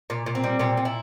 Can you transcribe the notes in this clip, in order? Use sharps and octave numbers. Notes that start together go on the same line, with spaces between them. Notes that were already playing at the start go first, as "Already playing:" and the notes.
A#2
A#2
C4
G3
A#2 C4
A#2
E4